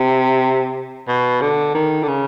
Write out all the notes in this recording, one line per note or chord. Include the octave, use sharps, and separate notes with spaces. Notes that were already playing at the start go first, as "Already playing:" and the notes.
Already playing: C3
B2
D3
D#3
D3
C#3